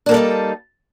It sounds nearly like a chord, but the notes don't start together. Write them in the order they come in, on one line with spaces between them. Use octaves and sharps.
D4 A#3 A4 G3 D#4